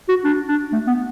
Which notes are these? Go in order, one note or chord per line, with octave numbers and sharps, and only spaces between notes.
F#4
D4
D4
A3
B3